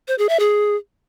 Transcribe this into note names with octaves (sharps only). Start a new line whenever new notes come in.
C5
G#4
E5
G#4